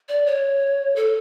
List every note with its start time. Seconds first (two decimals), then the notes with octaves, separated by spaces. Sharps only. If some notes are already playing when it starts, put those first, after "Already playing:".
0.09 D5
0.26 C#5
0.96 A4